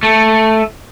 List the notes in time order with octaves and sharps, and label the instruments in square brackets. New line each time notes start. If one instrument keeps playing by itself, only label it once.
[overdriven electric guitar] A3